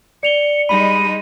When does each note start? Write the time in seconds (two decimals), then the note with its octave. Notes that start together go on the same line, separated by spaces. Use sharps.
0.23 D5 C#7 F7 G7
0.69 G3 G#3 D#4 B5 D#7